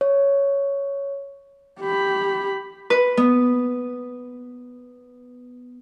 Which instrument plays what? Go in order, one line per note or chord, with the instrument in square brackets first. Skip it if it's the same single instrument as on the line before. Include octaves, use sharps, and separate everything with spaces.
[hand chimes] C#5
[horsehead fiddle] G4 B5
[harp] B4
B3